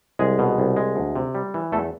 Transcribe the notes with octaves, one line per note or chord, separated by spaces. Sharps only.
C2 G#3 G#4
B2
C2
G#3
D2
C3
G3
E3
E2 A3 A4